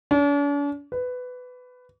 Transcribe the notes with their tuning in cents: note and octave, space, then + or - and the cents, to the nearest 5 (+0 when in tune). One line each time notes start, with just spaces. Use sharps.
D4 -45
B4 +15